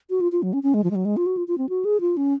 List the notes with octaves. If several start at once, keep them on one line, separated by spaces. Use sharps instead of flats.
F#4
F4
F4
F#3
C#4
C#4
G#3
F3
G#3
F#3
G#3
F4
F#4
F4
F4
C4
F#4
G#4
F4
C#4